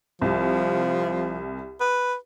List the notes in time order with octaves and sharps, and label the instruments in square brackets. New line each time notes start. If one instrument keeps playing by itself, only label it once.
[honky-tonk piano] C2 [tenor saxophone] F3
[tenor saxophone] B4